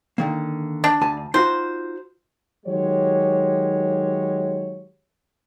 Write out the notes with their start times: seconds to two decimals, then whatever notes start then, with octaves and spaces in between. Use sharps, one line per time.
0.18 D3 D#3 A#3
0.84 D4
1.01 D2 G#5 A5
1.34 D#4 F4 F#4 C5
2.66 D#3 F#3 G#3 F#4 G4 C#5